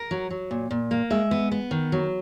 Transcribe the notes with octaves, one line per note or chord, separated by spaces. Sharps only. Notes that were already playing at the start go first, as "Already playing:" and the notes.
Already playing: A#4
F#3
F#3
A#2
A#2
A#3
G#3 E5
B3
B3
D#3
F#3